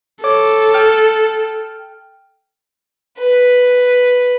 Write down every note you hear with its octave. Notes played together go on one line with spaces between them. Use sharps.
A4 C#5 D6
G5 F6
B4